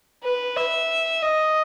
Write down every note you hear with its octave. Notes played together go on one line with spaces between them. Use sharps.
B4
E5
D#5